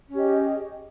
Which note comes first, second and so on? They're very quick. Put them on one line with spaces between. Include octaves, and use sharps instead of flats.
C#4 G4 D#5 G#4